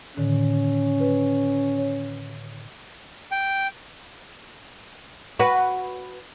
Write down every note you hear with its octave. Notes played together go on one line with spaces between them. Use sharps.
A2 D3 D#3 C#4
B4
C#5
G5
F#4 B4